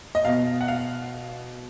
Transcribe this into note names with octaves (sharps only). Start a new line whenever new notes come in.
D#5
B2 F5
F#5
F5